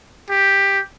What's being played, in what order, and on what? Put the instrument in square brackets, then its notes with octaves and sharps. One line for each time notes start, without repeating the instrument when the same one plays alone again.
[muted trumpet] G4